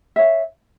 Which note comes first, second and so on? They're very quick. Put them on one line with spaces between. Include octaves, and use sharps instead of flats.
E5 C#5 F5